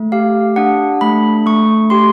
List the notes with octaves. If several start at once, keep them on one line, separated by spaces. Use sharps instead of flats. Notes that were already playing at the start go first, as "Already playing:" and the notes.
Already playing: A3
G4 F5
D4 F#5
A3 B5
A3 C#6
G4 C6